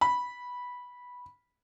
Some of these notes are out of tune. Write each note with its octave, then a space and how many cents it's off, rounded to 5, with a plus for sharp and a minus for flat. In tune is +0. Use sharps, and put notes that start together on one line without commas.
B5 -10